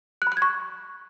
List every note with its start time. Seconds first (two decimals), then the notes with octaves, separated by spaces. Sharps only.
0.22 F#6
0.27 B5
0.32 F#6
0.37 G#6
0.42 C#6